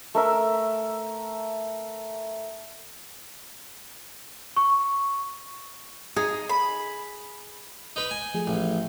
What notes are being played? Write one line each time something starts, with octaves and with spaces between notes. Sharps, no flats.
A3 A#4 E5
C#6
D#4 G#4
B5
D#4 B4 B5
G#5
F3 A3 G#4
A1